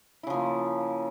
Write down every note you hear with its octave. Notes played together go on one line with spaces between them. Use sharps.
C#3 F3 A#3 E4